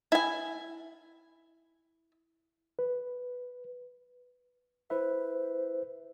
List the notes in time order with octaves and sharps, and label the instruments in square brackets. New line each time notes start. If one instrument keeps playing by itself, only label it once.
[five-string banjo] E4 G#5
[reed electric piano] B4
[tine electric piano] E4 B4 E5 [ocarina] C5